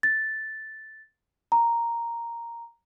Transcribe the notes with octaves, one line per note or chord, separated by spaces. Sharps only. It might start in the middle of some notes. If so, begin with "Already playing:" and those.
A6
A#5